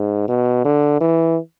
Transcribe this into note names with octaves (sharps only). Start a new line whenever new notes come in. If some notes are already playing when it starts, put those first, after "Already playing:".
Already playing: G#2
B2
D3
E3